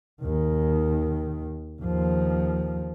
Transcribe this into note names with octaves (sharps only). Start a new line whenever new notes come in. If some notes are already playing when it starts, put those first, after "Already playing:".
D#2 D#3
D#2 F3